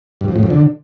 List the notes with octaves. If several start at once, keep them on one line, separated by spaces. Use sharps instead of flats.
G2
F2
A2
F2
D3